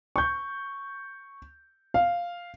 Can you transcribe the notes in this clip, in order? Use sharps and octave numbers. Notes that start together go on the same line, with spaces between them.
C#6 G6
F5